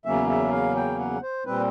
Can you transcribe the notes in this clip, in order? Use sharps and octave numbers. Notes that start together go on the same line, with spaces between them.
E2 C#3 F#3 A#3 C#4 E5
E5
F5
G5
F#5
C5
A#2 G3 C4 B4